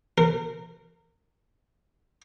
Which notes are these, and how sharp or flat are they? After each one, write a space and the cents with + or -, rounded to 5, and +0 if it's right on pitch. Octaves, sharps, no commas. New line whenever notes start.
A#4 -20